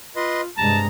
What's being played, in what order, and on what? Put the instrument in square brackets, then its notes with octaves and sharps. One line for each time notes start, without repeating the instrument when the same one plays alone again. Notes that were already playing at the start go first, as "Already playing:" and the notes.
[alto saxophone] F4 [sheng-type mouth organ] B4 D#5 C6
[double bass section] G2 C3 G#3 [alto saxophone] A5 [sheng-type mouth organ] A#5